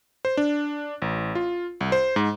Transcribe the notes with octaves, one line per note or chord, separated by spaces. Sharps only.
C5
D4
A1
F4
C2
C5
G#2